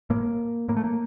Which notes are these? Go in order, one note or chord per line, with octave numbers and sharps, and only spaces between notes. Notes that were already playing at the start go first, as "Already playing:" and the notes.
A2 A#3
A2 A#3
A3
A#3